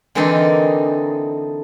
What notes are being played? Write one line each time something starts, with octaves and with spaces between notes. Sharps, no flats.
D3 E3 A#3 C4 D4 D#4